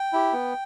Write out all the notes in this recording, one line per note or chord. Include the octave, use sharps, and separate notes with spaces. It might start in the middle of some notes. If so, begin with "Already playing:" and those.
Already playing: G5
E4 G4
B3